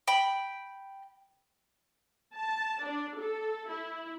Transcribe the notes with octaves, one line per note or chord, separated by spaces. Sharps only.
G5 B5
A5
D4
A4
E4